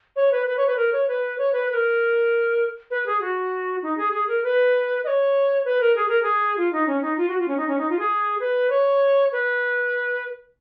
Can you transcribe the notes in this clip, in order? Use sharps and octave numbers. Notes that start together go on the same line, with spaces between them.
C#5
B4
B4
C#5
B4
A#4
C#5
B4
C#5
B4
B4
A#4
B4
G#4
F#4
D#4
G#4
G#4
A#4
B4
D#5
C#5
B4
A#4
G#4
A#4
G#4
F4
D#4
C#4
D#4
F4
F#4
F4
C#4
D#4
C#4
D#4
F4
G#4
B4
C#5
B4